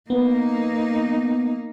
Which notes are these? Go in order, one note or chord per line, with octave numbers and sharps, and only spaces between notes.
A#3 B3 D#4